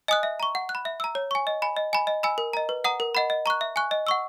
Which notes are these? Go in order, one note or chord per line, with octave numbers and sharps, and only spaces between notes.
D#5 G#5 D#6 F#6
E5
A#5 C#6
F#5
F#6
B5
E5
A#5 E6
C#5
G#5 C#6
D#5
G#5 B5
D#5
G#5 B5
D#5
G#5 B5 E6
A#4
D#5 A#5
B4
F#5 A#5 D#6
A#4
D#5 F#5 B5
D#5
A#5 C#6 F#6
E5
G#5 C#6 F#6
D#5
F#5 C#6 E6